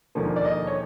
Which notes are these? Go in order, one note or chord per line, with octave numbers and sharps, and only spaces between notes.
E1 D#2 D3 F3 A#3
D5
D#5
C#5